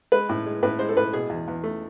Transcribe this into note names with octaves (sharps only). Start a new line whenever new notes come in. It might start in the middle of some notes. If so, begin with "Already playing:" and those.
G#3 B4
A2
G#3
A2 B4
G#3 C5
A4
A2 B4
B2 G#4
E2
E2
A3